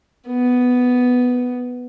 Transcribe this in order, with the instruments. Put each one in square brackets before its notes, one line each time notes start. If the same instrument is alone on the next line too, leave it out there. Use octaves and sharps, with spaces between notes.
[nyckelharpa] B3